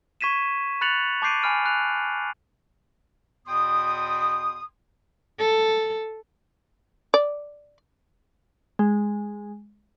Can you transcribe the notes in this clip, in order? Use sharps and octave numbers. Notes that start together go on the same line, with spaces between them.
C#6 G#6 B6 D#7 E7
B5 F#6 A6 C#7 F7 F#7
A5 D6 G6 C7 D7 D#7
G#5 B5 F6 D7 D#7
B5 F#6 F7
E2 B2 G5 C6 D#6
A4
D5
G#3